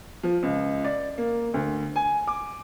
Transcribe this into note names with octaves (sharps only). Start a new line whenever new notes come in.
F3
C#2
D5
A#3
D2
G#5
D6